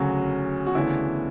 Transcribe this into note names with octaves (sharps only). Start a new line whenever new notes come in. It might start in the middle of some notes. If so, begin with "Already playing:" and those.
Already playing: D2 C#3 F#3 C#4 F#4
F#4
D2 C#3 E3 B3 D4 E4